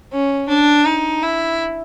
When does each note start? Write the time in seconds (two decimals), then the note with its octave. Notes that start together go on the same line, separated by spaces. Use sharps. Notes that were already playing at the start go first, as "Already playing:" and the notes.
0.12 C#4
0.48 D4
0.86 D#4
1.22 E4